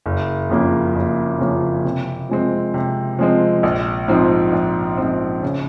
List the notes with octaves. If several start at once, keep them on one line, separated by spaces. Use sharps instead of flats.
F#1
F2 C#3 F3 A#3
F#1
F2 C#3 F3 A#3
C3
F3 G#3 C4
C3
F3 G#3 C4
A#1
G#2 F3 C4
A#1
G#2 F3 C4
C#3